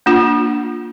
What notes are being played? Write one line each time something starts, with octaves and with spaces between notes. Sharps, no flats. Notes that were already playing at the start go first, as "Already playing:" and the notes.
A#3 D4 F4 F#5